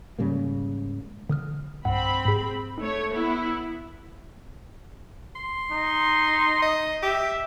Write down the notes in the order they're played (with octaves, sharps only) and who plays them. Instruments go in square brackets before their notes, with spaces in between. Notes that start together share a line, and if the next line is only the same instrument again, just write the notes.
[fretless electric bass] G#2 C#3 G3 A#3
[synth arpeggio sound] D3 D#6 F6
[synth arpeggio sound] B1 G2 F#5 [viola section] C4 B5
[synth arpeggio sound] G#2 G#4
[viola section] A3 C#5 [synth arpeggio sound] D#4
[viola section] B3 E4
[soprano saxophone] C6
[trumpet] D#4
[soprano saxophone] D#5
[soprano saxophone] G4 [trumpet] E5